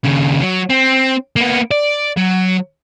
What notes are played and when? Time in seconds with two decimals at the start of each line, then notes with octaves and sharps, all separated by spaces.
0.04 D#2 C#3
0.42 F#3
0.70 C4
1.36 A#3 B3
1.71 D5
2.17 F#3